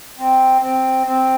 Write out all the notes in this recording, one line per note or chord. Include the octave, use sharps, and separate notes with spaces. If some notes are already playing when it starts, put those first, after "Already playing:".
C4
C4
C4